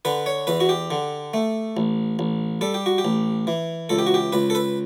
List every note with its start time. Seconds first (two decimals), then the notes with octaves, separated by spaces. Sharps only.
0.05 D3 B4
0.26 C#5
0.47 E2 B4
0.60 F#4
0.69 G4
0.90 D3
1.34 A3
1.77 A1
2.19 A1
2.61 G3 A4
2.74 G4
2.86 F#4
2.98 G4
3.05 A1
3.47 E3
3.89 C#2 A4
3.99 G4
4.07 F#4
4.14 G4
4.33 C#2 B4
4.50 A4
4.55 B4